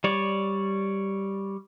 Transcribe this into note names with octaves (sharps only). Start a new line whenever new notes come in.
G3 C#5 D5